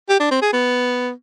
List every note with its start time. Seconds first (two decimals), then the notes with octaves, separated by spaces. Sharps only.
0.09 G4
0.20 D4
0.31 C4
0.42 G#4
0.53 B3